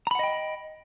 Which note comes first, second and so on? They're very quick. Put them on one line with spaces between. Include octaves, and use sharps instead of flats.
A#5 B5 F#5 D#5 G5